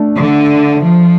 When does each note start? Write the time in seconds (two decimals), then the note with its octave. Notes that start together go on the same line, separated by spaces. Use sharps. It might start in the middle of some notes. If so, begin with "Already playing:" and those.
Already playing: A3 D4
0.15 D3
0.82 F3